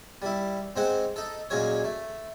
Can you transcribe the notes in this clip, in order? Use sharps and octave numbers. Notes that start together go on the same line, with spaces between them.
G3 E4
G#2 G#3 C4 C5 F#5
D#4 A4
A#2 F#3 G#3 C#4 G#4 C#5
A3